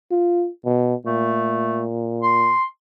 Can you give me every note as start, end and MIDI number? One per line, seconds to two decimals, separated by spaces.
0.11 0.48 65
0.65 0.95 47
1.06 2.53 46
1.06 1.85 57
2.23 2.64 84